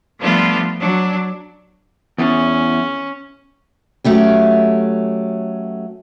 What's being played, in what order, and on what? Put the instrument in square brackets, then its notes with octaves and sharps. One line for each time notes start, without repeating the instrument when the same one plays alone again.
[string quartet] F3 G3 A3 B3 D4 F4
F#3 D4
[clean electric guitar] E2 [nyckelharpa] C#4
[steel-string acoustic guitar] F#3 A3 C#4 G4